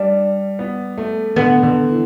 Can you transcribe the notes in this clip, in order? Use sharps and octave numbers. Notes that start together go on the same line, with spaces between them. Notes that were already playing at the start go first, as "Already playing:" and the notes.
Already playing: G3 D4
B3
A3
D3 B3
D3
E3